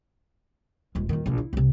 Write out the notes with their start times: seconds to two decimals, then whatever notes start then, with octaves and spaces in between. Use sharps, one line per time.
0.95 D#1 G#3
1.09 D#1 D#3
1.26 A#1 B2
1.38 E4
1.53 C2 C3